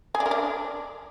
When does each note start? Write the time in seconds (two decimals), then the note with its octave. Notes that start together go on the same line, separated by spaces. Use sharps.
0.15 G#4
0.20 D4
0.26 A#4
0.31 D4